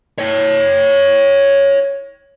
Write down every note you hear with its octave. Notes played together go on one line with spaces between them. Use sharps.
C#5 G5